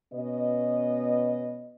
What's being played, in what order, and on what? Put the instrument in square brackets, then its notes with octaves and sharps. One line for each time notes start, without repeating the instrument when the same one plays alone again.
[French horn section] B2 B3 C#4 D#5